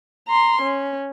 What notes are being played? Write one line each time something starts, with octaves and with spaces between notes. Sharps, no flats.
A#5 C6
C#4